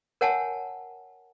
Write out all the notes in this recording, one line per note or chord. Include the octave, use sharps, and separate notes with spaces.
A#4 C#5 F#5 G#5 A5